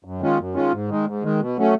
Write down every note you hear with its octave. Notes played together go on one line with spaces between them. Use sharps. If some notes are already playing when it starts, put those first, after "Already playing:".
F#2
D#3 G#3 C#4 F4
F#2
D#3 G#3 C#4 F4
G#2
D#3 G#3
G#2
D#3 G#3
B2
F#3 A3 C#4